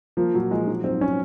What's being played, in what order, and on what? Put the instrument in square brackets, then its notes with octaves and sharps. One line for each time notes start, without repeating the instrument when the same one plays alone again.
[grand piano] F3 [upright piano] A#3
[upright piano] A#2 [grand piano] F#3
[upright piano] F3 [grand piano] G#3
[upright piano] F#3
[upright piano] G#2 [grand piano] C4
[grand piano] C#4